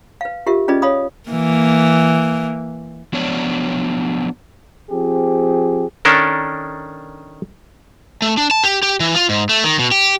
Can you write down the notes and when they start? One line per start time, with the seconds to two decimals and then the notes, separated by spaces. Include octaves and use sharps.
0.21 B4 F5
0.46 F4 G4 A#4 E5
0.68 C#4 F4 G#4 B4 D5 D#5
0.82 C#5 F5 B5 D#6
1.29 E3 A#3
3.13 F3 F#3 B3 D4 C#5 D5
4.91 F3 C4 G4 G#4
6.05 D#3 C#4 D4 A4 A#4
8.22 A3
8.37 D4
8.51 A5
8.64 G4
8.83 G4
9.00 E3
9.15 F4
9.29 G#2
9.49 A3
9.64 D#3
9.79 B2
9.91 G4